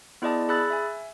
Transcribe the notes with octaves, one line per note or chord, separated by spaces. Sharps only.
B3 E4 G#4 D5 D#5 A5
G#4 B5 E6 F#6 A6
E5 G#5